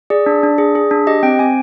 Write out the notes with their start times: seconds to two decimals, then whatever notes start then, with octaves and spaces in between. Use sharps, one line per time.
0.10 G#4 D5
0.26 D4
0.43 D4
0.58 G#4
0.75 G#4
0.91 D4
1.07 G4 D#5
1.23 C4 G5
1.39 C4 G#5